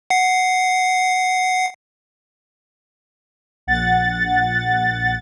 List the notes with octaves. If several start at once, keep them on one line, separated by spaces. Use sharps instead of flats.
F#5 C7
A#1 F#5 A6